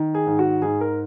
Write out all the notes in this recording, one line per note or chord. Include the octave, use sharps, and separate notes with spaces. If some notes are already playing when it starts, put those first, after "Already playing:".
Already playing: D#3
G#4
G#2
F#4
G#2 G#4
A#4